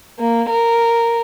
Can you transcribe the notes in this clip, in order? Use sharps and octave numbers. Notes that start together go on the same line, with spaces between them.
A#3
A#4